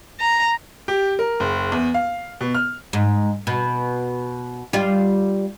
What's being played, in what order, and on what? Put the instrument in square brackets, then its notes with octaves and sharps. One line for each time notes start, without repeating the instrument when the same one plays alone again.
[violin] A#5
[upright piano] G4
A#4
F#1
E2
F5
B2
F6
[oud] G#2
B2
G3 F4